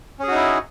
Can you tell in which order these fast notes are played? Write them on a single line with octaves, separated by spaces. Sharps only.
C#4 G#4 F#4 D#4 E4